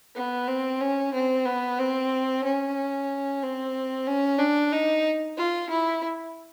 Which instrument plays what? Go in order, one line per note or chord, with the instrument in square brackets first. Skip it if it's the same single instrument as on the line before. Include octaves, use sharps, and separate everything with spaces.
[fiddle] B3
C4
C#4
C4
B3
C4
C#4
C4
C#4
D4
D#4
F4
E4